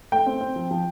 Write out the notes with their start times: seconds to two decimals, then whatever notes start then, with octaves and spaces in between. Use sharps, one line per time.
0.12 A3 G5
0.26 C4
0.41 C4
0.56 F3
0.71 F3